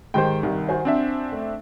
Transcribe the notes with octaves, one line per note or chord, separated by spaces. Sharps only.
G#2 D#3 G4 C5 G5
C2 G2 D#3
F#4 C5 G#5
C4 D4 E5
A3